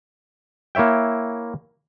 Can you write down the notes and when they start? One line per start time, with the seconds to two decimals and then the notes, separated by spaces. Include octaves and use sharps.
0.75 A#3 E4 C#5 E5 G5